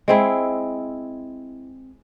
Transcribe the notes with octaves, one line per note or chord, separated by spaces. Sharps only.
G#3 C4 E4